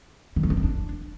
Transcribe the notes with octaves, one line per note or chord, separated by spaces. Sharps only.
D#3
A3
D4
C4
D4